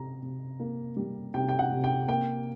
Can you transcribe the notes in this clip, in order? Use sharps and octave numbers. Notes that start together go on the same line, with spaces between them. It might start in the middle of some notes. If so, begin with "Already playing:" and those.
Already playing: C3 A#5
C3
A#3
G3
C3 G5
G5
F#5
C3
G5
A#3 G5